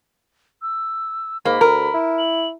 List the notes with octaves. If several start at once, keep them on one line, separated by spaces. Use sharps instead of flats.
E6
G#2 A#3 B5
D2 A#4
E4
F#7